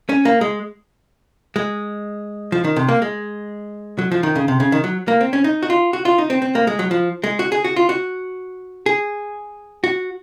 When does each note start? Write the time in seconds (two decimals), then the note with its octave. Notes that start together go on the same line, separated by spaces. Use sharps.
0.09 C#4
0.25 A#3
0.41 G#3
1.56 G#3
2.52 F3
2.65 D#3
2.76 C3
2.88 A#3
3.02 G#3
3.99 F#3
4.12 F3
4.23 D#3
4.36 C#3
4.48 C3
4.60 C#3
4.72 D#3
4.84 F#3
5.08 A#3
5.21 C4
5.33 C#4
5.44 D#4
5.63 F#4
5.70 F4
5.93 F#4
6.05 F4
6.18 D#4
6.30 C4
6.42 C4
6.55 A#3
6.67 G#3
6.79 F#3
6.91 F3
7.24 G#3
7.39 F#4
7.52 G#4
7.64 F#4
7.76 F4
7.89 F#4
8.86 G#4
9.84 F#4